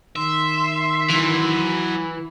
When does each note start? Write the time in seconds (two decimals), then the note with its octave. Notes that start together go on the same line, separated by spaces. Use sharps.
0.16 D#3 E5 C6
1.10 E3 F#3 E5